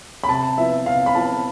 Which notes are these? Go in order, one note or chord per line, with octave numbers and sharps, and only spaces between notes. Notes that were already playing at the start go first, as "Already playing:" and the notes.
B5
C3 A5
F3 B3 E4 E5
C3 F5
B5
F3 B3 E4 A5